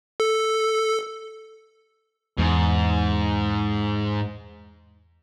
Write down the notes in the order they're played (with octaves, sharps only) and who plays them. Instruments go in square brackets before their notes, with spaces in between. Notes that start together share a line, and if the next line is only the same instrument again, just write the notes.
[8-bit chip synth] A4
[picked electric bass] E2 [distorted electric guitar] G#2